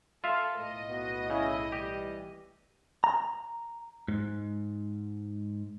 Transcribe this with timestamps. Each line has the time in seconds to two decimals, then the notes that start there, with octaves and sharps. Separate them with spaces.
0.24 F4 A4 E5 F5
0.55 B1 A2 D#5
0.89 B3 F#4
1.30 C#3 E4
1.72 E3 G3 G4
3.04 A#5
4.08 G#2